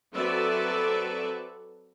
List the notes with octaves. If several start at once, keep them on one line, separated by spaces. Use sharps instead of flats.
F#3 C4 A4 B4 D5 E5